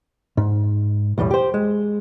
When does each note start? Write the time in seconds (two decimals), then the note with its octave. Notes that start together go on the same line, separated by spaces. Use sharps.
0.37 G#2
1.18 B1 E2 A2 G3
1.31 G4 C5
1.54 G#3